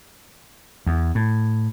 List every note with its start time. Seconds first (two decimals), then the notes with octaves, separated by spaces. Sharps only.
0.86 E2
1.15 A2